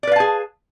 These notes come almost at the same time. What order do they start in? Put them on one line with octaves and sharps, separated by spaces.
D5 B4 F5 A5 G#4